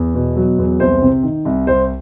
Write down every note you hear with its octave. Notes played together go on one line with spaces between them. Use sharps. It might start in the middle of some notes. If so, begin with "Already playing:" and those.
Already playing: E2
B2
F#3
E2
C2 C5
C3
D#3
C2
C2 C5